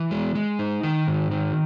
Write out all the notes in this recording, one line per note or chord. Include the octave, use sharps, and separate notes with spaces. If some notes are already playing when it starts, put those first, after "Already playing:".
Already playing: E3
G#3
G#3
D#4
D#3
G#2
D#3